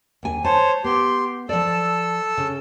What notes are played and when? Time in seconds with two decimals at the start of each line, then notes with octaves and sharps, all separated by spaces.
0.23 D#2 G#5
0.44 C5 C#5 A5
0.84 B3 G4 C6
1.49 F3 A4 D5 E6
2.37 C#3